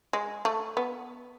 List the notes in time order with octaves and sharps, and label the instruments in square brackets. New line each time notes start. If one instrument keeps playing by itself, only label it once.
[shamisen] G#3
A3
B3